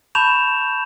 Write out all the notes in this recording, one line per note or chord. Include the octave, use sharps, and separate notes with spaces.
A5 B5 C#6 G6 E7 F7